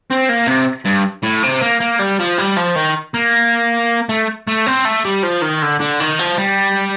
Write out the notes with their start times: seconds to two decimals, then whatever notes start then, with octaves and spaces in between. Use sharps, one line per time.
0.10 C4
0.29 A#3
0.47 C3
0.85 G2
1.23 A2
1.43 C3
1.62 A#3
1.81 A#3
2.00 G3
2.20 F3
2.38 G3
2.56 F3
2.76 D#3
3.14 A#3
4.09 A3
4.47 A3
4.66 C4
4.85 A3
5.05 G3
5.23 F3
5.42 D#3
5.62 D3
5.80 D3
6.00 D#3
6.19 F3
6.38 G3